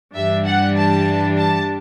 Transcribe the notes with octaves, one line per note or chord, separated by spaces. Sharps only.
G2 E3 G3 D4 E5
F#5
A5
A5